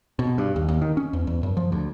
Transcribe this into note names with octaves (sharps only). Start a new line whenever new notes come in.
B2
G2
D#2
D#2
D#3
C#4
E2
E2
F#2
F3
D2